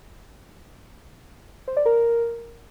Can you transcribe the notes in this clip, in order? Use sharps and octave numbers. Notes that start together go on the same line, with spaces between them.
C5
D5
A#4